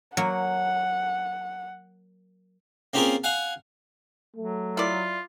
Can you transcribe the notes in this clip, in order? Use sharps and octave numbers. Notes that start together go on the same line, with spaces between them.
F#3 A#3 F#5
A#3 C4 C#4 F4 G#4 A#4
F5 F#5 G#5
F#3 A3
E4 F4 D5